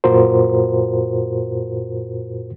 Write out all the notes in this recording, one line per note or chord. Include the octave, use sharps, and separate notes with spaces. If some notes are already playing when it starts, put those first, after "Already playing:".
F#2 A#2 F4 F#4 A#4 C5